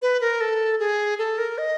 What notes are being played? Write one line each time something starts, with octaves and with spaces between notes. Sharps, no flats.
B4
A#4
A4
G#4
A4
A#4
D#5